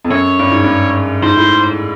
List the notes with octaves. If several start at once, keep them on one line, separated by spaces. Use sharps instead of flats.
F2
F#2 C#5
G2
G#2
G2
G#2 C5
A2